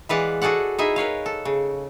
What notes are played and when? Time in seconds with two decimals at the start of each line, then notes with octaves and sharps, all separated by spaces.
0.09 E3 G#3 B4 D5 F5 F#5
0.42 F#4 G#4 A4 D5 F#5
0.78 D#4 E4 G#4 E5
0.96 A#4 B4 C#5 F5
1.26 A4
1.45 C#3